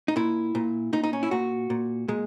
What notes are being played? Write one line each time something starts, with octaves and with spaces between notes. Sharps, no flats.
D#4
A#2 E4
A#2
A#2 D#4
D#4
C#4
E4
A#2 F#4
A#2
A#2 G#3